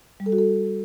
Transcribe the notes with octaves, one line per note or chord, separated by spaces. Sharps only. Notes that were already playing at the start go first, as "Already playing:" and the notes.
G3
A4
F#4
A4